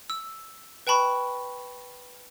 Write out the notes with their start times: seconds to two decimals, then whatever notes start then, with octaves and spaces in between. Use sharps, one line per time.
0.10 E6
0.87 B4 G5 A5 B5 C#6